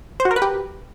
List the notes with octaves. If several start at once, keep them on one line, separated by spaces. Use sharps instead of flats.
C5
F#4
A#4
B4
G4